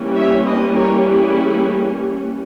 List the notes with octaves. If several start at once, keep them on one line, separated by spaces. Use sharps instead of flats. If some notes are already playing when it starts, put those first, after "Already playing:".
Already playing: E3 G3 A#3 C#4
C#5 E5
B4 D#5
A#4 C#5
E4 G#4